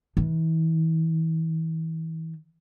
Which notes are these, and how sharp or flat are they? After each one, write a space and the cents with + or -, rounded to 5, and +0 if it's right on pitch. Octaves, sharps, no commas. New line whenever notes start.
E3 -35